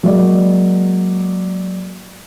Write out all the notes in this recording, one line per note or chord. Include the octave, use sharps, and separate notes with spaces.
F#3 G#3 A#3 D5